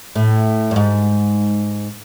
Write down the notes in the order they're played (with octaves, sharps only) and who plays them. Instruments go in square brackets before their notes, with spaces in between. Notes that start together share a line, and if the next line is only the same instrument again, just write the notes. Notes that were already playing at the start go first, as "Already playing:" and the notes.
[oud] A2
G2
G#2